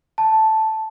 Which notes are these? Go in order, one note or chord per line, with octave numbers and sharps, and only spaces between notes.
A5